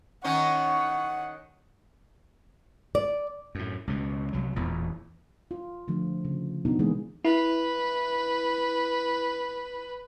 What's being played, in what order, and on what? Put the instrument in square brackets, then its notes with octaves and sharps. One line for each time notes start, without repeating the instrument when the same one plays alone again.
[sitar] D#3 C#4 D#4 [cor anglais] C#5 [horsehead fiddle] F#5
[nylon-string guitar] D5
[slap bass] F#2 A2
C#2 B2
C2 F#3
E1 E2 A#2
[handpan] F4
D3 F3 A3
C#3
B2 B3 D4 D#4 F#4
E3 G#3 A#3 G#4 B4
[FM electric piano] E4 [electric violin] B4